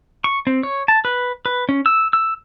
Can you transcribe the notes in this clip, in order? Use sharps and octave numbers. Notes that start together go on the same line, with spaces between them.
C#6
C4
C#5
A5
B4
B4
C#4
E6
E6